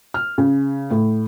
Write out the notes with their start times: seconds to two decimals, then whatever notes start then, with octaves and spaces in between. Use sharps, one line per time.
0.14 F6
0.38 C#3
0.91 A2